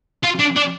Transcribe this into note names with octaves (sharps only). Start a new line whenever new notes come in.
F4
D4
D4